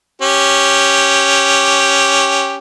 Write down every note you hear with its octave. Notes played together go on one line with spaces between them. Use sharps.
C#4 G4